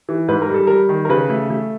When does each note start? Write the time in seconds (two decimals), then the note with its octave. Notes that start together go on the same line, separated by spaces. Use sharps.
0.09 E3
0.28 G#2 B4
0.42 A#4
0.49 G3 A4
0.67 G3 A#4
0.89 D#3
1.05 A#4
1.09 C#3 B4
1.30 A3
1.50 A3